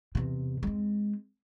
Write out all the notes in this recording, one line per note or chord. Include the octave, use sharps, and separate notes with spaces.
E2 C3
G#3 C4